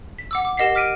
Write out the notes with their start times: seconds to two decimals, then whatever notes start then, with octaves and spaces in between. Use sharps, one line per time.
0.19 B6
0.31 F#5 D6 E6
0.45 D6
0.57 G4 A#4 D#5 F#5 B6 C7
0.75 D6 F6 B6 D7 D#7